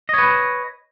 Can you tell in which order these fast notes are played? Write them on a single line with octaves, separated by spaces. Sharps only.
D#5 C#5 B4